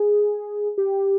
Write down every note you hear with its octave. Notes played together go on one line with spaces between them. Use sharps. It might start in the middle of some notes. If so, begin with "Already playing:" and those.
Already playing: G#4
G4